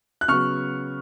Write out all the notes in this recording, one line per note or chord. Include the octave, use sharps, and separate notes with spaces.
F#6
C#3 F#3 B3 C#6 F6